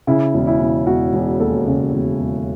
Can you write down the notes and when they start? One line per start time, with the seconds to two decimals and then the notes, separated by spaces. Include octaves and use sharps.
0.07 C#3 E4
0.34 E1
0.47 E4
0.60 E1
0.87 E1 F#4
1.13 E1
1.40 D#2 A4
1.67 C#3
1.93 E1
2.20 E1